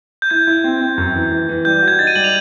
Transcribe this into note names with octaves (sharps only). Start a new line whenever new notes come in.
G6
E4 G#6
E4
C4
C4
F#2
E3
E3
E3
G3 G6
F#4
G#6
D#4 A6
D#7
G3 F#7
F7